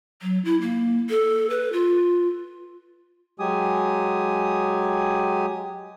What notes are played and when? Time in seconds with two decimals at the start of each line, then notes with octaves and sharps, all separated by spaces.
0.22 F#3
0.45 E4
0.62 A#3
1.10 A4
1.50 B4
1.73 F4
3.40 F#3 G#3 G4 G#5 D#6